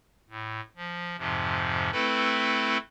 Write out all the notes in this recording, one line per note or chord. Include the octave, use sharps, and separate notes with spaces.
A2
F3
F2 G#2 C3 F3
A3 C4 E4 A4 B4